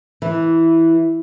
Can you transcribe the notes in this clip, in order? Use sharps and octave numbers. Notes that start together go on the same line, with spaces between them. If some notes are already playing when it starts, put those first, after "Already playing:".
E3